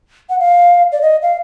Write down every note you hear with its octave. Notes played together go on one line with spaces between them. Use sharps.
F#5
F5
D5
D#5
F5